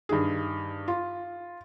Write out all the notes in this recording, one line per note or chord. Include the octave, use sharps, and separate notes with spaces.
G2 D#3 G#4
F4